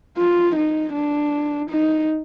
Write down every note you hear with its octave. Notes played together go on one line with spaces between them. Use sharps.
F4
D#4
D4
D#4